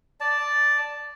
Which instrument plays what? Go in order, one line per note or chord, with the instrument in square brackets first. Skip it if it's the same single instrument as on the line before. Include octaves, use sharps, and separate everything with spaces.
[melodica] D5 A5